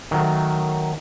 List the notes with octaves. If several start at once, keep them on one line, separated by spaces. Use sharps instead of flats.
D#3 F#3 A3